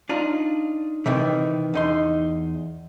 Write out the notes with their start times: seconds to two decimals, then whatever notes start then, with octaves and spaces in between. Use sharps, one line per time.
0.09 D4 D#4 F4
1.06 C3 D#3 E3
1.74 E2 D#4 C6